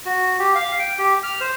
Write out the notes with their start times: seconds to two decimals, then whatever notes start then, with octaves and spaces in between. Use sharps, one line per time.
0.06 F#4
0.39 G4
0.55 F5
0.79 G5
0.98 G4
1.23 F6
1.41 C5